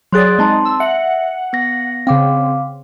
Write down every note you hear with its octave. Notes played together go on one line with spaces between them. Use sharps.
F#3 G#4 D5 C6 F#6 A6
G#3 C4 D#4 A5 C6
E6
E5 F#5
B3 A#6
C#3 C4 F5 D6